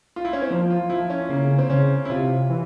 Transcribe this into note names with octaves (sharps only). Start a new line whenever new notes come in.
F4
E4
C#4
C4
F3 A#3
F4
F3 E4
C#4
C#3 A#3
C4
C#3 C#4
E4
C3 F4
E3